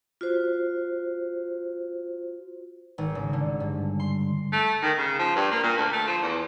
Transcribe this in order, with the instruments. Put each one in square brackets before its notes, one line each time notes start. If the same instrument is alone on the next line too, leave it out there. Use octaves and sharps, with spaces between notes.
[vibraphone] F4 F#4 C5
[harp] G#1
C#3
D3
G2
C6
[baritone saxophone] A3
D#3
C#3
F3
G2
A#3
A#2
D2
A3
F3
E2